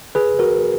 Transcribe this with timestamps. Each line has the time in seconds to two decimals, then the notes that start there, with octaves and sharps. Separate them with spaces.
0.15 G#4 B4
0.39 F#4 A#4